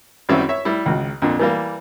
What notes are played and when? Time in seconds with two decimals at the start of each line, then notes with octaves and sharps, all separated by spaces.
0.29 G#1 F#2 G3 C4 E4 E5
0.49 C#5 E5
0.65 G3 E4
0.86 G#1 C#2
1.22 F2 A#2 D3
1.39 E3 G3 A#3